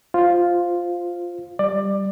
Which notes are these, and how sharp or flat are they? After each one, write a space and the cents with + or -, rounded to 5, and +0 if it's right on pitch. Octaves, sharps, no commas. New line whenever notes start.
F4 +0 C5 +0 F5 +0
G3 +0 D5 +20